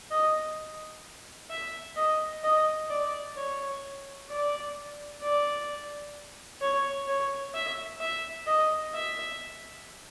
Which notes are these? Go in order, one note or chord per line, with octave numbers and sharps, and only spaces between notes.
D#5
E5
D#5
D#5
D5
C#5
D5
D5
C#5
C#5
E5
E5
D#5
E5